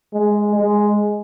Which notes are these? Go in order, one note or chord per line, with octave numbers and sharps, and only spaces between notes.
G#3
G#3